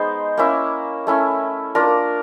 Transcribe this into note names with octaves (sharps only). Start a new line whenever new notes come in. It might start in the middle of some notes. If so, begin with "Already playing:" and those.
Already playing: G#3 B3 D#4 C5
A#3 C#4 E4
A3 C#4 E4
A#3 D4 F4 A#4